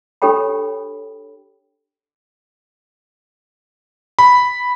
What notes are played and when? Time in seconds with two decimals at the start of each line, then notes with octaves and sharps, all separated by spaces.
0.22 D4 G4 A4 C#5 G5 B5
4.19 B5